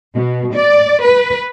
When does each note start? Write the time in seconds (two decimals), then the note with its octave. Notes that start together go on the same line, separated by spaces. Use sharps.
0.16 B2
0.55 D5
1.03 B4